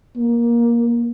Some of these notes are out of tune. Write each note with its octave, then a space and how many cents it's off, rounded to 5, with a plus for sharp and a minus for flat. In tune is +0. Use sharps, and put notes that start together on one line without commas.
A#3 +15